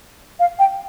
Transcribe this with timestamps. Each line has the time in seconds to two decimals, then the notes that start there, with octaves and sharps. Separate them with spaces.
0.40 F5
0.59 G5